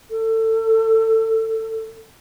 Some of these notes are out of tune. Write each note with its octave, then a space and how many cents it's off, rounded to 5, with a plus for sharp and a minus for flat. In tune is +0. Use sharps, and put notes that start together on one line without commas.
A4 +25